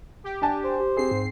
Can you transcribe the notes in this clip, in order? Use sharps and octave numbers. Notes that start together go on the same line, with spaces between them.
G4
D4 G#5 A5
C5
G4
C4 G#4 C7
G#2